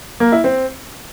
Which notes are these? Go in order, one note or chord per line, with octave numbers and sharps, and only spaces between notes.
A#3
E4
C4